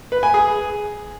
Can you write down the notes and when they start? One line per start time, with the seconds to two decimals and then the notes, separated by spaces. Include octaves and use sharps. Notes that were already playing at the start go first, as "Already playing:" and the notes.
0.12 B4
0.23 G#5
0.34 G#4